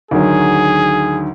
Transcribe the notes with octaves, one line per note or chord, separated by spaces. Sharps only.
D2 D#3 F#3 G#4